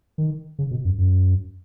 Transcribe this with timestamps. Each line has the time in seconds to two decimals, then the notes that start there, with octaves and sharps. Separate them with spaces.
0.18 D#3
0.59 C#3
0.71 B2
0.85 F#2
0.98 F#2